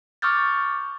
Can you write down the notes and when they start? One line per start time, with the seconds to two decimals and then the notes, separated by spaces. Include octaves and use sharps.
0.22 C#6 D6 E6 F6 G6 A6